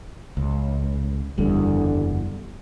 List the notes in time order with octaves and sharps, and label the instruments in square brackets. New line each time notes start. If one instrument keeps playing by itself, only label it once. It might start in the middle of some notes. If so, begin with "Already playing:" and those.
[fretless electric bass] C#2
[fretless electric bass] F#1 E2 [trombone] D3 [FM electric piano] G3